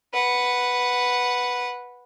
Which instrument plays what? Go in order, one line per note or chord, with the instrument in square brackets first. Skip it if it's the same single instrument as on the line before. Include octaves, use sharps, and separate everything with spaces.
[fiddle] B4 F#5